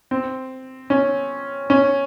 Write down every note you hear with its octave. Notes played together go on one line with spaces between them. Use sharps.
C4
C#4
C#4